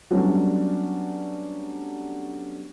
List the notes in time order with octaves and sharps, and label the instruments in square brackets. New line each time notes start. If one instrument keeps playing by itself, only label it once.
[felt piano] F#3 G3 A3 B3 C#4 D4